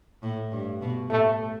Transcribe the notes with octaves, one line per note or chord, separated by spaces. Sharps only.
A2
G2
B2
A2 A3